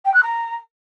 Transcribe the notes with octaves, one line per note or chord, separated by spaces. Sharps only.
G5
F#6
A#5